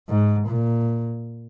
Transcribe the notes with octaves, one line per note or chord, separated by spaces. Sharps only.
G#2
A#2